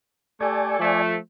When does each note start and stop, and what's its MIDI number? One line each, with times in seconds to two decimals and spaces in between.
0.41 0.77 57
0.41 0.77 67
0.41 0.77 69
0.41 1.02 74
0.41 1.02 80
0.80 1.16 53
0.80 1.16 57